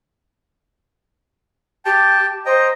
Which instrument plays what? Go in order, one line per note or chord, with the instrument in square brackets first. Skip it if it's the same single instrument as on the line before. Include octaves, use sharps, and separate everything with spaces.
[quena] G4 [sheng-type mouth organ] G5 A5
[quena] C5 [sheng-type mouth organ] D#5 G5 A#5